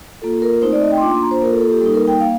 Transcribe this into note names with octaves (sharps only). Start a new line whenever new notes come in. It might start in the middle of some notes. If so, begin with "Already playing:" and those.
A#3 F4 A4
A#4
A3 C4 D#4 C5
D5
D#5
G5
C6
A#3 D4 F4 D6
C6
A#5
C5
A#3 F4 A#4
A4
A4
G4
G3 A#3 D#4 A4
A#4
G5
A#3 F5